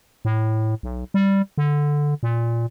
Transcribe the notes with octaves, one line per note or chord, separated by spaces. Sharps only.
A2
B1
G3
D3
A#2